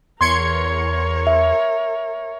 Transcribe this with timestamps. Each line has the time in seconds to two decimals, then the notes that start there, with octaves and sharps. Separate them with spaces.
0.21 E2 A#4 C#5 C6 G#6 C#7
1.27 E5